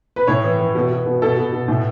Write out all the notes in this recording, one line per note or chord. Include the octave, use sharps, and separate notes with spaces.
B4
A2 C#5
E3
E3
B2
B2
B2
B2 A4
B2
B2
A2